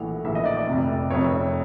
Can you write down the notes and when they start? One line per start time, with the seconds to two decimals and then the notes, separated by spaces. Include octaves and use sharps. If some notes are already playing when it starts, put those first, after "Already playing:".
Already playing: A#1 A2 E3 A3 F#5
0.24 A#1 A2 E3 A3 E5
0.35 D#5
0.45 D5
0.57 D5
0.68 F1 F2 C3
1.10 F1 F2 C3 C#5